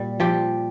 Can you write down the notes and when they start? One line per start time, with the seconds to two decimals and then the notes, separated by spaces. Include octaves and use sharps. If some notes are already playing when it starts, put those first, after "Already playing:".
Already playing: A#2 G3
0.20 F3 G4